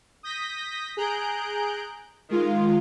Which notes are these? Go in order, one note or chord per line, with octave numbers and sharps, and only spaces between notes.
D#6 G6 A#6 B6
G#4 A#5 F#6 G6 D7
D#3 G#3 F4